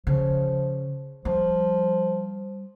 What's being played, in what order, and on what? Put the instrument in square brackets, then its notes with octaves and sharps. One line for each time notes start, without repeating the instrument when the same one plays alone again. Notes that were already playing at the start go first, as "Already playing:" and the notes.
[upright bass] C#3 [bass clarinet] F3
[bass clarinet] F3 [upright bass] G3